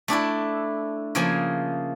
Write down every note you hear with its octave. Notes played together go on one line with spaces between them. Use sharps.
A3 D4 E4 A4
C#3 F3 A#3 G#4 G#5